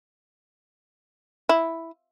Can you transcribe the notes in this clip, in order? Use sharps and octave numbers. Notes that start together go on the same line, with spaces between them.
E4